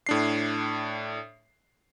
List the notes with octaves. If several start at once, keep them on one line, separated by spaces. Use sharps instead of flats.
A2 D4 C7